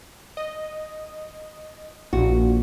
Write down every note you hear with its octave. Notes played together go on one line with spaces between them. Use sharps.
D#5
A#1 A#2 F#4